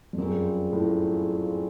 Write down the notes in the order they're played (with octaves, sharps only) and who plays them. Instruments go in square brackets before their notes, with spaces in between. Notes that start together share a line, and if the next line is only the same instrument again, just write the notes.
[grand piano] F2
[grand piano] F#2 [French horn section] G3 C4 F4 G#4
[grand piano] A2